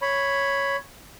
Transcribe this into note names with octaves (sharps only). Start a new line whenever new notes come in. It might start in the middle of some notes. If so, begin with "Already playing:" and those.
C#5 B5